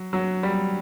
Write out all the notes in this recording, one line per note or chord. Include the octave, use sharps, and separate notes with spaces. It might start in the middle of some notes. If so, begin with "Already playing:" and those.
Already playing: F#3
F#3
G3